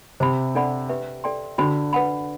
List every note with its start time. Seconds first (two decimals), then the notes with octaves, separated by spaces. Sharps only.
0.20 C3 C5 E5 B5
0.55 D4 A4 D5 F#5 B5
0.89 G4 B4 E5 G5
1.24 A4 D5 G5 C6
1.58 D3 F#4 C5 G5 B5
1.93 B4 F#5 B5